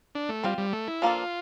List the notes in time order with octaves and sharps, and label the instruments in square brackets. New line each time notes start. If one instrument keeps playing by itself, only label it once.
[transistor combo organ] D4
A3
[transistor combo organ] G3 [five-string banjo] C4 F4 C5
[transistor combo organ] G3
A3
E4
[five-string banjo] F3 A#3 D4 A4 [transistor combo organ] F4